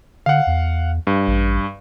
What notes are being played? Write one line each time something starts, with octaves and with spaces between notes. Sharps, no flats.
D3 F5 F#5
E2
G2
A1